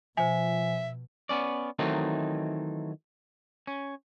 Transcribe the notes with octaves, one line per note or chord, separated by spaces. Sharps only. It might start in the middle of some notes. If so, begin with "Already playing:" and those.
B2 F3 C5 E5 G#5
B3 C#4 D5
D#3 E3 F#3 A3 C4 D#4
C#4